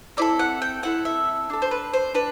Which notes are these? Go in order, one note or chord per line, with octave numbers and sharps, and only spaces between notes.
C4 E4 A4 D5
F#5
G5
C4 E4 A4 F#5
E5
D4 A4
C5
B4
C5
D4 B4